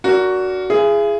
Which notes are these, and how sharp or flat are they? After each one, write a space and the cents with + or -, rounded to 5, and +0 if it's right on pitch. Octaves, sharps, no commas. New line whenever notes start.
D4 -25 F#4 +5 A#4 -5
E4 +45 G#4 +0